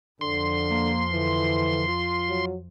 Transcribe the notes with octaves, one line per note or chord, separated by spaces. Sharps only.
F2 D3 F3 C6
A#3
D3 E3
F4
F#3